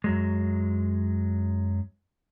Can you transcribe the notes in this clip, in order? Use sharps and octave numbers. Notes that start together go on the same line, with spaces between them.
F#2 F#3 G#3